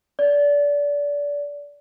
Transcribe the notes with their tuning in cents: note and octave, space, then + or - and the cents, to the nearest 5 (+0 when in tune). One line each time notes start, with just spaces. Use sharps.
D5 -25